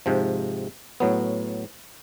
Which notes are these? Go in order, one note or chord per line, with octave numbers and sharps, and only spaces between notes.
G#2 C3 F3
A2 F#3 B3